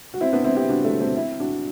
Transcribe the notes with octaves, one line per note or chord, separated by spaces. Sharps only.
F#4
C4 E4
B3 D4
C4 E4
E4 G4
D4 F#4
F#3 A3
A3 C4
C4 E4
D4 F#4